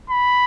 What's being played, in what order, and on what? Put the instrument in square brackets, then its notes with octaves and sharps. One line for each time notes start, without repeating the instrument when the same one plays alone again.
[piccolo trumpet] B5